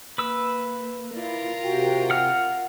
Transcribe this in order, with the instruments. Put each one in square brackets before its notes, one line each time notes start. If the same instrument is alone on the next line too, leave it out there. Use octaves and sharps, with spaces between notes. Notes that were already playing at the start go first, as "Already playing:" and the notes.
[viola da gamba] A#3 [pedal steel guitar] B4 E6
[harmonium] E4 D5 [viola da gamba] F4 A#4
[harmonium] C3 F#4 G5
[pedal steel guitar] F#5 F6